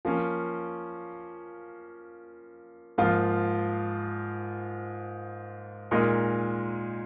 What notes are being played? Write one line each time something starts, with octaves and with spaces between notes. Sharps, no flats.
F3 A#3 C#4
G#2 F3 A#3 F4
A#2 G#3 D#4 A#4 D#5